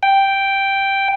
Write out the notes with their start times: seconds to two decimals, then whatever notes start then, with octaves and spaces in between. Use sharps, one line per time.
0.03 G5